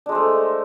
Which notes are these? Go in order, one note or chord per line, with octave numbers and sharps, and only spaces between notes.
G#3 A3 D4 C5